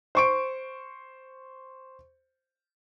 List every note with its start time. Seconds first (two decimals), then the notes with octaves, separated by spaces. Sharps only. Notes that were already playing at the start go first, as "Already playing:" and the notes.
0.15 C5 C#6 D7